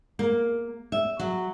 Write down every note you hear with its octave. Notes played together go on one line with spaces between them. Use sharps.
A#3
E5
F#3